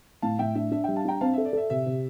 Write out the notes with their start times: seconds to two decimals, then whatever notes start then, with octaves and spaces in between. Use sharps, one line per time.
0.22 A2 F5 A5
0.39 A2 E5 G5
0.55 D4 E5
0.71 D4 E5
0.84 G3 E5 G5
0.96 F5 A5
1.05 D4 G5 A#5
1.21 C4 F5 A5
1.33 A4 E5
1.45 D5
1.53 A4 E5
1.70 C3 E5
1.86 C3